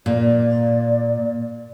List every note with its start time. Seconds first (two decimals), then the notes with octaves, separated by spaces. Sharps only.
0.06 A#2 D5